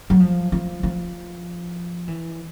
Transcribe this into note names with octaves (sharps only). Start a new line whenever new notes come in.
F#3
F3
F3
F3
E3